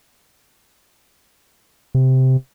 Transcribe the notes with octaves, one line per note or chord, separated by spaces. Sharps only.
C3